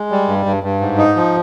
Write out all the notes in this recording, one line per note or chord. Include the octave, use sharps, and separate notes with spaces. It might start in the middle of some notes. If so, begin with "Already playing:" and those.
Already playing: G#3
G3
G2
G2
G2
G#2
D#4
F3